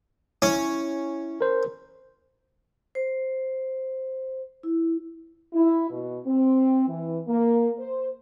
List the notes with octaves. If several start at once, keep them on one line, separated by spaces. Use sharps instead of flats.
C#4 E4
A#4 C5
C5
E4
E4
B2
C4
E3
A#3
C5